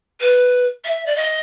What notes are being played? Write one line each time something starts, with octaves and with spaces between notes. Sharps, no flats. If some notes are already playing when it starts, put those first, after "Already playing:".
B4
E5
D5
D#5